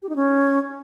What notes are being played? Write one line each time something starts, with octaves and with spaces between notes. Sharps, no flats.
G4
D#4
C#4